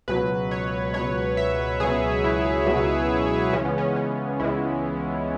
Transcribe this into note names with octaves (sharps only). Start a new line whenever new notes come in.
C#2 B2 F#3 B4
C#5
C#2 B2 F#3 C#5
E5
C#2 B2 F#3 G#4
E4
C#2 B2 F#3
C#2 C#3 E3 G#3 C#4
B3
C#4
C#4
C#2 C#3 E3 G#3 E4